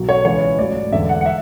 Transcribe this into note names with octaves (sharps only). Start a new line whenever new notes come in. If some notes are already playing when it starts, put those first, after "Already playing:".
Already playing: B1 B2 F#3
C#5
C#2 C#3 E3 C#5
A1 G#2 F#3 D5
E1 E2 D3 E5
F#5
F#5
E5